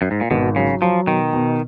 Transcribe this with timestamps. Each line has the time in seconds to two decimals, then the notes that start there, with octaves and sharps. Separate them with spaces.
0.02 F#2
0.11 G#2
0.21 A#2
0.31 G#1 B2
0.56 C#3 F#3
0.82 F3 F#3
1.07 B2 D#3
1.33 B2